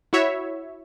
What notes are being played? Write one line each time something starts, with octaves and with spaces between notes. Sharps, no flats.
E4 F#4 C#5 E5